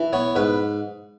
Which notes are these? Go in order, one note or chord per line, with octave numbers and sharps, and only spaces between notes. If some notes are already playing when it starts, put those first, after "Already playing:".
Already playing: E3
B3 C#5
G#2 B4